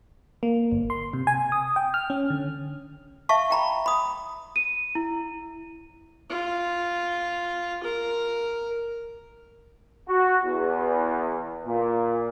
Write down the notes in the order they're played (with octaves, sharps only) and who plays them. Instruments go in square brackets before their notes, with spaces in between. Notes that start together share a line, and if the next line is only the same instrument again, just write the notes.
[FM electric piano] A#3
G1
C6
C3
G#5
D#6
G5
F6
C#4
D3
[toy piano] E5 F5 A5 C#6
G5 A#5 B5
B5 D#6
[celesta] D#7
E4
[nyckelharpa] F4
A#4
[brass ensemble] F#4
E2
A#2